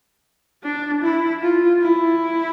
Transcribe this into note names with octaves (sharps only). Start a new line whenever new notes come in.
D4
E4
F4
E4